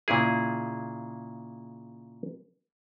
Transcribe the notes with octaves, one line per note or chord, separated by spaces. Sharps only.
A#2 C#3 E4 G#4